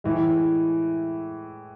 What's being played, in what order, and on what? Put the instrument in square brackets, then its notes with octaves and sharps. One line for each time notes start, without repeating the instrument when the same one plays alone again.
[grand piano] A2 E3 G#3